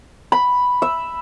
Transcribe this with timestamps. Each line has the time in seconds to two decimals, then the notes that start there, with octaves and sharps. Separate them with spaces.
0.32 B5
0.82 E5